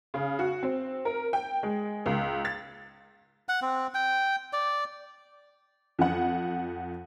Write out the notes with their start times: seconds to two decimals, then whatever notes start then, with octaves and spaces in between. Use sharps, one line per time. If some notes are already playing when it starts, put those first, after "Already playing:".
0.14 C#3
0.39 F#4
0.63 C4
1.05 A#4
1.33 G5
1.63 G#3
2.06 C#2
2.45 A6
3.49 F#5
3.62 C4
3.94 G5
4.53 D5
5.99 F2 F#5